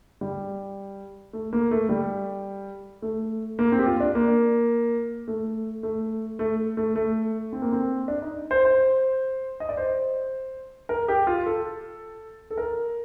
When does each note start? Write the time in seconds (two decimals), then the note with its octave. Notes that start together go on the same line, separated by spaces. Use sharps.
0.21 G3
1.33 A3
1.53 A#3
1.71 A3
1.89 G3
3.02 A3
3.59 A#3
3.72 C4
3.79 G4
3.86 F4
4.00 D4
4.15 A#3
5.28 A3
5.83 A3
6.39 A3
6.77 A3
6.96 A3
7.53 C4
7.62 A#3
7.72 C4
8.08 D4
8.22 D#4
8.51 C5
8.65 C5
9.60 D#5
9.69 D5
9.77 C5
10.89 A#4
11.08 G4
11.27 F4
11.46 A4
12.51 A4
12.58 A#4